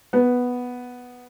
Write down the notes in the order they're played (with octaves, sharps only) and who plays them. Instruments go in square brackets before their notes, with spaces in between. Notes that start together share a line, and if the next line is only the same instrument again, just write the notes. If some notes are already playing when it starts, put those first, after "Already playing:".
[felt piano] B3